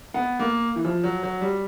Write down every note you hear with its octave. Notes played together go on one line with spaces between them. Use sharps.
B3
A#3
E3
F3
F#3
F#3
G3